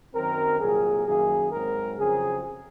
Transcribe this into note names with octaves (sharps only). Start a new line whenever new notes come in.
F#2 D#3 F#3 C4 A#4
C2 A#2 F#3 G#4
F#2 D#3 A#3 G#4
G#2 F#3 C4 A#4
F2 C#3 F#3 C4 G#4